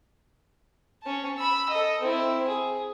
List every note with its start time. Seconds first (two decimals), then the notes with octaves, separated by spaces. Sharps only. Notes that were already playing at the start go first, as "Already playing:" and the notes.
1.03 C#4 A5
1.38 B5 E6
1.69 A4 D#5
2.01 C4 E4
2.48 G#4